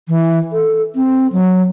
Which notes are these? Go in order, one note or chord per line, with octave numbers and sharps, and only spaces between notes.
E3
A4
C4
F#3